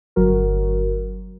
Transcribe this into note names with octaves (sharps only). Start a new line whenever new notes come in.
G1 F#3 F#4 A#4